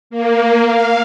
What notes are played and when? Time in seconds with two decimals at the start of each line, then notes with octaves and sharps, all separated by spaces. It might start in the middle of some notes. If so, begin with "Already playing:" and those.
0.10 A#3
0.65 F5